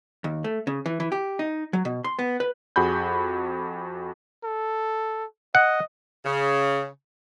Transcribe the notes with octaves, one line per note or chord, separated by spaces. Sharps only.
D#2
A3
C#3
E3
E3
G4
D#4
F#3
B2
C6
B3
B4
F2 F#4 G#4 B5 G6
A4
D#5 F#5
C#3